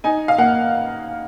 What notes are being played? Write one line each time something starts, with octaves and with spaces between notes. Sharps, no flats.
D#4 G#5
F5
A#3 F#5